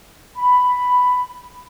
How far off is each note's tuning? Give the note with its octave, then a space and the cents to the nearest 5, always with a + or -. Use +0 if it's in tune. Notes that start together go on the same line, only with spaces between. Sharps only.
B5 +5